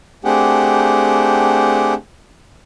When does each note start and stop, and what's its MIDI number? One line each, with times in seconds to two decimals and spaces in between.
0.25 1.94 57
0.25 1.94 60
0.25 1.94 62
0.25 1.94 67
0.25 1.94 68
0.25 1.94 78